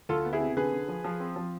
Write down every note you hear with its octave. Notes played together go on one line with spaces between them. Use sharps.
D2 F4 A4
B3
E4 G#4
C3
D3 G#4 B4
D3
F3
F3
C4
F3